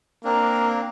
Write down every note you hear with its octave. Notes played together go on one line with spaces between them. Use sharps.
A#3 C4 D4 A#5